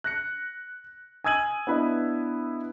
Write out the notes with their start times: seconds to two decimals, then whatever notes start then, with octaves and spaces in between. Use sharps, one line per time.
0.04 F#6 A#6 C#7
1.24 G#5 D#6 E6 G#6 D#7 F#7
1.67 B3 D4 E4 B4 D#5